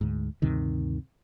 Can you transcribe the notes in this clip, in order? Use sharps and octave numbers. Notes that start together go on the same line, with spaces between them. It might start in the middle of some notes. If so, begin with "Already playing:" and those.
D2 G#2
D2 G2 C3 D#3